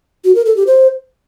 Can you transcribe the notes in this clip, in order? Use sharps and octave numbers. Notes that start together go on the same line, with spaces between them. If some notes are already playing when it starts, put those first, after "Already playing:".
F#4
A#4
A4
G4
C5